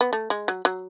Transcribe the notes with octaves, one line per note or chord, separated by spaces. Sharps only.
B3
A3
G#3
F#3
F#3